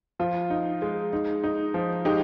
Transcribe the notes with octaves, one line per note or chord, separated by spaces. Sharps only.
F3 F4
D#4
G#3
D#4
D#4
F3
G#3 D#4 G4